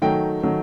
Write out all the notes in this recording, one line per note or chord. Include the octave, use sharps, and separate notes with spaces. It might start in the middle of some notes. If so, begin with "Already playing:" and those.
D#3 F#3 A3 G5
D#3 F#3 A3